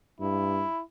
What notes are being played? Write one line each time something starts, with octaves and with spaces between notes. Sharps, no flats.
G2 E4